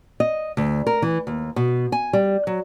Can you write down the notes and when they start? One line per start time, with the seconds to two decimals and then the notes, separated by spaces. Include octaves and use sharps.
0.20 D#5
0.57 D2
0.87 A#4
1.02 E3
1.27 D#2
1.56 B2
1.92 G#5
2.13 G3
2.47 F#3